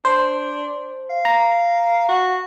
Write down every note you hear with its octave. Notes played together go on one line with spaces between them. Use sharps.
D4 C5
F5
A#5
F#4